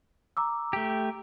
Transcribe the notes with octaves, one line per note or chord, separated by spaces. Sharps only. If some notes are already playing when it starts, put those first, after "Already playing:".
A#5 D6 E6
A3 G4